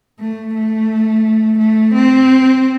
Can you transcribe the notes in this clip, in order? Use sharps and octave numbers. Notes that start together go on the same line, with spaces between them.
A3
A3
A3
C4